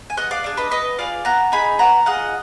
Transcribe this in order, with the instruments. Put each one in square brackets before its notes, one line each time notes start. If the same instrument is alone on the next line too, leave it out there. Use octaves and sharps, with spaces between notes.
[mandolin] G#5
B3 D#5 F#5
D5 F5
D4 G#4
B4 D#5
B3 B4 D#5
F4 G#4 D5 F5
B3 F#5 A#5
D#4 G#4 G#5 B5
B3 F#5 A#5
F4 G#4 D#5 F#5